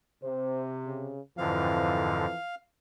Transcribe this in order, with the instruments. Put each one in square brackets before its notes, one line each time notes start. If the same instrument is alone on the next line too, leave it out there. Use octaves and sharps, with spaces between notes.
[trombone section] C3 [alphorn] C5
[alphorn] C#3
[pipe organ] F2 G#2 D3 [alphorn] E3 [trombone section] F3 C4 A4 [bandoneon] F5